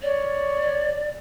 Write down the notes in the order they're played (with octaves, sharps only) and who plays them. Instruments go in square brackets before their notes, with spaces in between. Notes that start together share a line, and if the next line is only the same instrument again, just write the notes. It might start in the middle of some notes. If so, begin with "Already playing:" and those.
[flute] C#5 [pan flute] D5